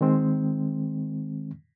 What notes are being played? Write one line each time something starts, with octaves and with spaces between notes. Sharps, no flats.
D#3 G#3 C4